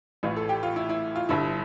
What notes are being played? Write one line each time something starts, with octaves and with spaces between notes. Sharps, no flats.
A1 A2 E3 F4
A4
G4
F4
E4
E4
F4
G1 G2 D3 E4